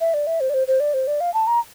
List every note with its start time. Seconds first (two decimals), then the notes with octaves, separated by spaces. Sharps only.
0.01 E5
0.14 D5
0.27 E5
0.40 C5
0.50 D5
0.54 C5
0.68 C5
0.80 D5
0.94 C5
1.07 D5
1.21 F5
1.34 A5
1.47 A#5